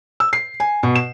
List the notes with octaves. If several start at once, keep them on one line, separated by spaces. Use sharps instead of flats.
E6
C7
G#5
B2
E7